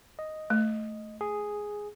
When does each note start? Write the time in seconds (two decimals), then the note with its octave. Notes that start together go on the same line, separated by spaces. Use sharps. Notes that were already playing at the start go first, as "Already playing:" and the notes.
0.19 D#5
0.50 A3
1.21 G#4